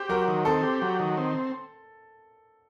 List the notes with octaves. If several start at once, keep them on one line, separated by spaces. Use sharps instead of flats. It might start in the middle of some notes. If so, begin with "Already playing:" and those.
Already playing: G4 C5
F#3 A#4
D#3
C4 A4
G4
F#3
D#3
C4